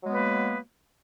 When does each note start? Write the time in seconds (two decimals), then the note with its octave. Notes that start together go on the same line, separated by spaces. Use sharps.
0.03 F#3
0.06 G#3
0.09 B3
0.13 B4
0.16 A#3